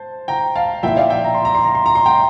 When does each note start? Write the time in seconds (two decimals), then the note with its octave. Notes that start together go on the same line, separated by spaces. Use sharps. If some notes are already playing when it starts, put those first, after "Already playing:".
Already playing: C5 A5
0.28 G5 A#5
0.56 F5 A5
0.83 A#2 F3 A#3 E4 E5 G5
0.97 D5 F5
1.10 E5 G5
1.24 A#5
1.34 C6
1.45 A#5
1.55 C6
1.65 A#5
1.75 C6
1.86 A#5
1.95 C6
2.06 G5 A#5